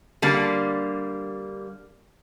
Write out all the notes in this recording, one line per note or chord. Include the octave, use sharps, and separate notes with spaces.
D3 G3 A#3